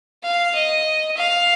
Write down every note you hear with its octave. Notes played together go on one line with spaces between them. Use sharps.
F5
D#5
F5